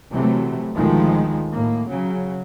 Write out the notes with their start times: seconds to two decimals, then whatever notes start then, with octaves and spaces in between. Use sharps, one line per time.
0.11 C3 E3 F#3 A3
0.75 D2 B2 D#3 F3 G#3 A3
1.50 A2 A#3
1.89 C#3 F#3